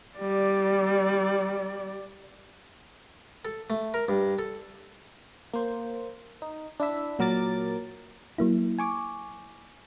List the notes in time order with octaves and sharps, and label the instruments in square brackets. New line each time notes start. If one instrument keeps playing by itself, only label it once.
[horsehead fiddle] G3 D5
[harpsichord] A4
A3
A#4
G2
A4
[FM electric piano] A#3 C5
D#4
D4 E4 E5
A#2 F#3 A#4 D6 A6
[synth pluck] F#3 A#3 E4
G#5 C#6 D6